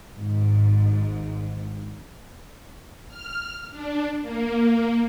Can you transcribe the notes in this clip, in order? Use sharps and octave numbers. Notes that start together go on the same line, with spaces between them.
G#1 G#2
F6
D4
A#3